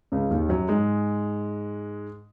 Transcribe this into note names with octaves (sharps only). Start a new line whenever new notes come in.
C#2 C#3
D#2 D#3
F#2 F#3
G#2 G#3